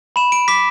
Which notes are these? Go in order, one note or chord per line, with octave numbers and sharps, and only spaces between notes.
B5 E7
D7
D6 B6